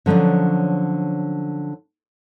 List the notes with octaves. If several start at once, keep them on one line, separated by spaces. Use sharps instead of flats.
D3 F3 F#3 C#4 D4